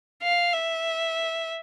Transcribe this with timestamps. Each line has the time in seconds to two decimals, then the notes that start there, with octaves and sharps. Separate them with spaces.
0.23 F5
0.53 E5